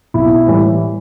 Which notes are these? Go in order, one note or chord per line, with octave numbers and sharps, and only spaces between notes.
B1 E4
A2 E3 G3